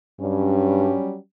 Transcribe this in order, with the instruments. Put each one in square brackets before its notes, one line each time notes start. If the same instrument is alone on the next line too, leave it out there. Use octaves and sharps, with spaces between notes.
[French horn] G2 [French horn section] F#3 G3 C#4